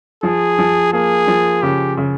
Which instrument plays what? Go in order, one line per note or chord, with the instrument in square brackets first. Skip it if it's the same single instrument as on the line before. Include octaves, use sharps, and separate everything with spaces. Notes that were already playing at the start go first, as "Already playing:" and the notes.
[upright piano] F3 [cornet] G#4
[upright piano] F3
[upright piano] A#3 [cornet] G#4
[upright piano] F3
[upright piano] C#3 [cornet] G4
[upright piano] C#3